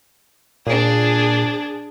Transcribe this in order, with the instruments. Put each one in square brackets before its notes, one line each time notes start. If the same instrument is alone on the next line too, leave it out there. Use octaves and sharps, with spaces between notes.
[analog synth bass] A#2 [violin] D4 G#4